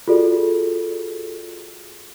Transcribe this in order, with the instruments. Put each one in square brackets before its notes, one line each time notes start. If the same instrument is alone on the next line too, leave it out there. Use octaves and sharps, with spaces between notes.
[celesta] F4 F#4 G#4 A4 D5